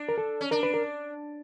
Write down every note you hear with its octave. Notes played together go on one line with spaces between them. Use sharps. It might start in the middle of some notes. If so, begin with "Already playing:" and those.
Already playing: D4
A#4
A4
C#4
D4 A#4
B4
A#4